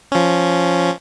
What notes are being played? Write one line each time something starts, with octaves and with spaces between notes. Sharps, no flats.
F3 C#4